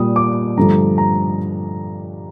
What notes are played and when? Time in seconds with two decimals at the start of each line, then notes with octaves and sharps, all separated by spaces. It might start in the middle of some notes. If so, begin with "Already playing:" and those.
Already playing: A#2 G3 A#3 D#6
0.16 D6
0.57 G2 D3 F3 A3 A#5
0.98 A#5